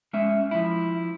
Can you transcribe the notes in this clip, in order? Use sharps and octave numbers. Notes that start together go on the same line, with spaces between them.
G#3 C#4 E5
F3 E4